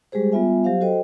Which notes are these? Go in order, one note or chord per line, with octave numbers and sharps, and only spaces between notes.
G3 G#3 G4 G#4 C5
G3 B3 F4 E5 G#5
F#3 G4 C5 F5
F#4 A4 C5 D#5 G5